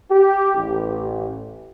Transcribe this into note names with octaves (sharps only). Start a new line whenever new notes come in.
G4
A1